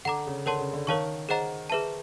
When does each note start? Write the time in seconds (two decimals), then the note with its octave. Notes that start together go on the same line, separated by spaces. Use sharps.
0.05 D3 F#5 A#5 D6
0.26 C#3
0.46 D3 A#4 C#5 F#5 A5 C6
0.60 C#3
0.73 D3
0.87 D#3 A#4 C#5 F5 A5 C#6
1.29 G#4 C5 D#5 F#5 A#5
1.70 G#4 B4 E5 A5